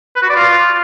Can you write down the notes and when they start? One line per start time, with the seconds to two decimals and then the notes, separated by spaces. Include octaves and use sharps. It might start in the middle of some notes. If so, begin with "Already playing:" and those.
0.16 B4
0.22 F#4
0.29 D5
0.36 F4